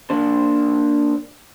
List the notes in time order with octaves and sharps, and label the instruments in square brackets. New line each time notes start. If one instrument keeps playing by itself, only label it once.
[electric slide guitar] A#3 D4 C5